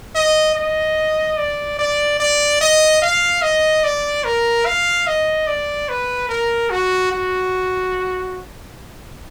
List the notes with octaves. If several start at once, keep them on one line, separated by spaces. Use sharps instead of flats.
D#5
D#5
D5
D5
D5
D#5
F5
D#5
D5
A#4
F5
D#5
D5
B4
A#4
F#4
F#4